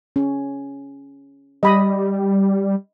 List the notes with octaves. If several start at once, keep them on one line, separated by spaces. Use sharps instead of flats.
C#4
G3 D#5 B5 D#6